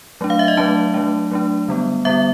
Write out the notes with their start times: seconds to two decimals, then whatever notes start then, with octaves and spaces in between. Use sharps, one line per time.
0.21 F#3 A3 D4
0.30 F5
0.39 E5
0.48 D#5
0.57 F#3 A3 D4 A5
0.94 F#3 A3 D4
1.31 F#3 A3 D4
1.68 D3 G3 B3
2.05 D3 G3 B3 E5